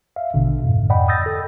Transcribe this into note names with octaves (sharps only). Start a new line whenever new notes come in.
E5 F5
A1 B2 D3
F2 G#2
D5 D#5 F#5 G5 B5
D#6 E6 G6 A6 A#6
A4